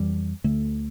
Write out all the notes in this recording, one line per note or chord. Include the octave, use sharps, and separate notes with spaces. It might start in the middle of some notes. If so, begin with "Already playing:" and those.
Already playing: F2 E3 G3
D2 D3 A3